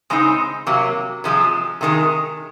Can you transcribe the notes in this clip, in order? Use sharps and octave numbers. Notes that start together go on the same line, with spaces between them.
C#3 G#3 C4 D#4
C3 F#3 A#3
C3 F3 G#3
C3 D#3 G#3